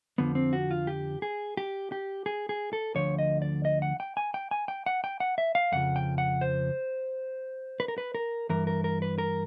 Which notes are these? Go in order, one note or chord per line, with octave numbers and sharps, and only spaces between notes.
F2 D3 F3 B3
C4
F#4
F4
G4
G#4
G4
G4
G#4
G#4
A4
D2 D3 F3 C#5
D#5
D5
D#5
F#5
G5
G#5
G5
G#5
G5
F#5
G5
F#5
E5
F5
F2 C#3 F3 F#5
G5
F#5
C5
B4
A#4
B4
A#4
G2 E3 A#4
A#4
A#4
B4
A#4